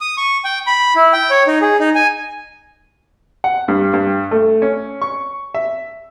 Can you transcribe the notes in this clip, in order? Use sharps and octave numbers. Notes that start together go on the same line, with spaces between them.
D#6
C#6
G5
B5
E4
G5
C#5
D#4
G#4
D#4
G#5
F#5
G2
G2
A3
C#4
C#6
E5